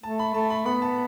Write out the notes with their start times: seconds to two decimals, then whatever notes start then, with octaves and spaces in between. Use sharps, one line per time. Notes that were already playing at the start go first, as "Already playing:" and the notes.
0.03 A3 A5
0.19 B5
0.34 A3 A5
0.50 B5
0.66 B3 B5
0.82 A5